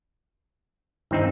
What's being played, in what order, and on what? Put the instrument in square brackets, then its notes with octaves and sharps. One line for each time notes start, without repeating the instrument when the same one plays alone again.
[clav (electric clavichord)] G2 C4 D#4 [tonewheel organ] D#3 E4